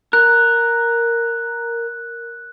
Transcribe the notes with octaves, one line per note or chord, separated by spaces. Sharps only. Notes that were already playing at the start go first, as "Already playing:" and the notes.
A#4 F#6